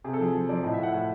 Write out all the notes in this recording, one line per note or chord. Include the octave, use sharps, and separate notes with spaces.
C3 G#4
A4
F3 G#4
F3
F3 D5
A2 D#5
E5
A2 F#5
A2 F#5